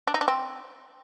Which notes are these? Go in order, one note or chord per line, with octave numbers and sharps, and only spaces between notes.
D4
D#4
D4
C4